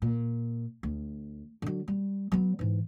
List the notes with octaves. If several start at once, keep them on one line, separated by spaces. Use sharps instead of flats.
A#2
D2
D3 F#3
G3
F#3 B3
G#2 E3